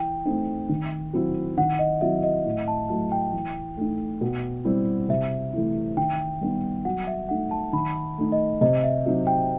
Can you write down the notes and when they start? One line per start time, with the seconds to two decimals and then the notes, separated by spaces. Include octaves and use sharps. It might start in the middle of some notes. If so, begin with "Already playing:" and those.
Already playing: E3 G5
0.25 A3 C4 D#4
0.69 D#3
1.13 F#3 C4 E4
1.57 D#3 F#5
1.79 D#5
2.01 F#3 C4 E4 E5
2.23 D#5
2.45 A2
2.68 A5
2.89 F#3 A3 E4 A5
3.12 G5
3.33 E3
3.77 A3 D#4
4.21 B2
4.65 G3 C4 E4
5.09 C3 E5
5.53 E3 A3 E4
5.97 D#3 G5
6.41 G3 B3 D#4
6.85 F#3 F#5
7.07 E5
7.29 A3 D#4 F#5
7.51 A5
7.73 D#3 B5
8.18 A3 D#4
8.32 D#5
8.61 C3 D#5
8.84 E5
9.06 F#3 C4 D#4
9.27 G5